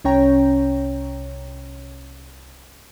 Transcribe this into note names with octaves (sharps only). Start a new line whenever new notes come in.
C2 C#4 C#5 G5 A#5